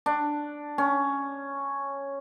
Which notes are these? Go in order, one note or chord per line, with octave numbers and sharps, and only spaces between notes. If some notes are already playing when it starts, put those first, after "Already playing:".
D4
C#4